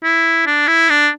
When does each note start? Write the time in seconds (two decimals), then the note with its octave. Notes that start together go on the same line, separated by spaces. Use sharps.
0.03 E4
0.46 D4
0.67 E4
0.90 D4